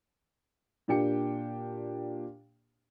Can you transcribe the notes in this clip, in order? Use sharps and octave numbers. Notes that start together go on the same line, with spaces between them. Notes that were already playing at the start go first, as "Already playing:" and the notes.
A#2 A#3 D4 G4 G5 C#7